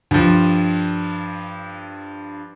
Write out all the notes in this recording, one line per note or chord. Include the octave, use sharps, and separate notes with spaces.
G2 F3